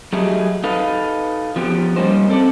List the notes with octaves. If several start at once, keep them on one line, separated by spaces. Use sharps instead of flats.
F#3 A3 D#4 G4 G#4
D#4 A4 B4 F5
F3 B3 G4
G3 A#3 C#4 D#4 C5
C4 A4 D5